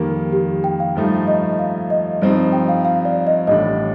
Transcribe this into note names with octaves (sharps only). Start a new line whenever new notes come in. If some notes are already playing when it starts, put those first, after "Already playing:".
Already playing: F2 D#3 G3 A#3 A#4
G4
G5
F5
G2 F3 A3 D#4
D#5
F5
D#5
G2 F3 C4 D#4 D#5
G5
F5
F5
D5
D#5
A1 A2 G3 D4 D#5